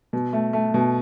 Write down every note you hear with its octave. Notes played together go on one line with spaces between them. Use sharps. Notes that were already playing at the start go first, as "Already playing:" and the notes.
B2
A3
A3
B2